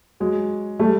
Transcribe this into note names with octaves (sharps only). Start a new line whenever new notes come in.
F#3 G#3
G3 A3